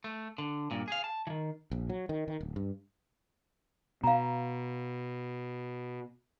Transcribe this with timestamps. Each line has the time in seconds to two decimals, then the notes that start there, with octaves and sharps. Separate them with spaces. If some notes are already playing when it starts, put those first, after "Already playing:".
0.04 A3
0.38 D3
0.71 G2 A#2
0.88 G#4 F5
1.04 A5
1.27 D#3 E3
1.71 A#1
1.89 F#3
2.09 D#3
2.28 D#3
2.41 D1
2.56 G2
4.04 B2 F5 A#5